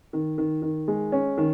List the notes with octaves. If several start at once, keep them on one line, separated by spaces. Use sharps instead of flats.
D#3
D#3
D#3
G#3
C#4
D#3